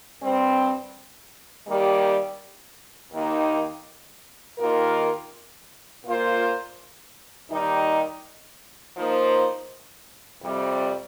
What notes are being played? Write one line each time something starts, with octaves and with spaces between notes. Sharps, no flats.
G2 G3 C4
D#3 G3 A#3 G4
D#2 D#3 A#3 D#4
D#2 D#3 A#3 F4 A#4
A#2 A#3 F4 C5
D#2 D#3 G3 D#4
F3 A#3 D#4 C5
F2 C3 G3